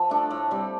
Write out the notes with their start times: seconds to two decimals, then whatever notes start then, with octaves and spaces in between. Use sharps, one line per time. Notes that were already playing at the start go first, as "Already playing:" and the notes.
Already playing: F3
0.10 A3 D4 A4
0.31 A2
0.51 G3 C4